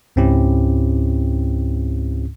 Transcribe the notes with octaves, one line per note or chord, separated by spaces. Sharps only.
C#2 G#2 C4 C#4 E4 G4